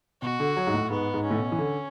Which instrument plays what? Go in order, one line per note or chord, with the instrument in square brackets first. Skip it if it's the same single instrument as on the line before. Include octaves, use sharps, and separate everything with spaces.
[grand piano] B2 [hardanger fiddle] F#4
[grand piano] D3
F#3
G#2
A2
[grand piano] G#2 [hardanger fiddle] B3
[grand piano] G#2
[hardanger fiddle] C#4
[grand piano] A2
B2
E3
D3